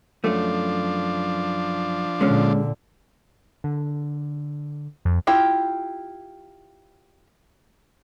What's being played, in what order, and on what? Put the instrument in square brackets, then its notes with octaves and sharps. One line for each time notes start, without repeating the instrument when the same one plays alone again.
[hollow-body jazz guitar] F#2 A3 [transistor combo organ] F3 D4
[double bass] A#2 D3 [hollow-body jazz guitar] G#3 C#4
[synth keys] D3
F2
[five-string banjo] E4 F4 G4 G5